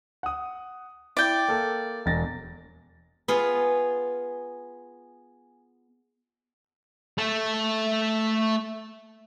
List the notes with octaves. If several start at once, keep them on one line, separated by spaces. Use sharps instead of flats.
F#5 D#6
E4 D5 G5
A#3 A4
E1 A6 A#6
B3 F4 G#4
A3 A4